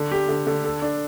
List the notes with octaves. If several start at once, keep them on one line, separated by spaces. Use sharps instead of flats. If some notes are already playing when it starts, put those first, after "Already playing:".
Already playing: D3
G4
D3
D3
A4
D4